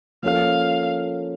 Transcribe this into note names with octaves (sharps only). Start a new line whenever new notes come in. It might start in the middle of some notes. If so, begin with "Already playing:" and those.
F3 A#3 C#4 F4 A4 F5